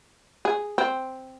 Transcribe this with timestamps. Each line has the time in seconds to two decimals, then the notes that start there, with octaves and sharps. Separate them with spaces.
0.45 G#4
0.78 C4